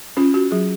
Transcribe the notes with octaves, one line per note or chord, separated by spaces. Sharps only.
C#4 F4
F#4
F#3 G#4